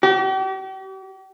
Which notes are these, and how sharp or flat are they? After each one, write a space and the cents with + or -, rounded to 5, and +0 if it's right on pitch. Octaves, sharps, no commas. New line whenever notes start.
G4 -40